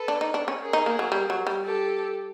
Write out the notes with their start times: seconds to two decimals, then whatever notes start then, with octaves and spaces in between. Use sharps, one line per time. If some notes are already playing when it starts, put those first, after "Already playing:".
Already playing: A4 B4
0.08 D4
0.21 D#4
0.34 D4
0.48 C#4
0.61 G#4 A#4
0.73 D#4
0.86 A#3
0.99 F#3
1.12 G3
1.30 F#3
1.47 G3
1.64 G4 A4